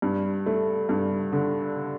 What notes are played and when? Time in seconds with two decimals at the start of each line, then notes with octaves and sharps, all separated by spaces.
0.02 G2
0.46 A3
0.89 G2
1.33 D3